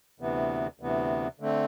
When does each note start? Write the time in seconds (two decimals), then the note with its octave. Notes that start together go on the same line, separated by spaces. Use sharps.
0.20 D2 C3 E3 B3
0.80 D2 C3 E3 B3
1.40 D3 A3 C4